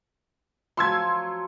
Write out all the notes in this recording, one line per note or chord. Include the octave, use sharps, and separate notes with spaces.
F3 F#3 C6 C#6 E6 G#6